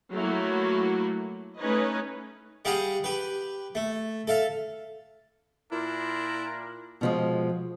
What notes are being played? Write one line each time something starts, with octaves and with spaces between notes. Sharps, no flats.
F#3 A3 A#3 E4 F#4
A3 C#4 D#4 B4 C#5 D#5
G3 G4 G#4 F5 F#5
G4 B4
A3
A4 E5 F5
A#2 D4 E4 F4 A#4
B2 F3 G#3